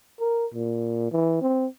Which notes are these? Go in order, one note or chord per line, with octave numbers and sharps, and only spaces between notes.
A#4
A#2
E3
C4